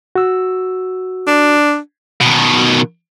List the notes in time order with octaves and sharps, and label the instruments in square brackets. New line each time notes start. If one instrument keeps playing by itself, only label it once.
[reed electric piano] F#4 E6
[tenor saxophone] D4
[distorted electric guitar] B2 D#3